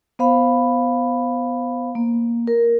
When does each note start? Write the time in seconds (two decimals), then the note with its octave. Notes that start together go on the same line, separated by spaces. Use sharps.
0.19 B3 C5 F5 B5
1.95 A#3
2.47 A#4